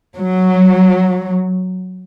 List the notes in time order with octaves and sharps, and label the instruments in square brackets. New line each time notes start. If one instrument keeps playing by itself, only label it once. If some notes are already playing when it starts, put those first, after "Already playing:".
[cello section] F#3